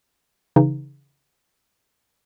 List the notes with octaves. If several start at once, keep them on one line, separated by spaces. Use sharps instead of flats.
C#3 E3 D#4